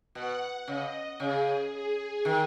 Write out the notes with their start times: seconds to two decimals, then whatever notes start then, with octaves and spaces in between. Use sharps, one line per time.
0.14 B2 F#5
0.68 C#3 D#5
1.20 C#3 G#4
1.73 G#4
2.25 D#3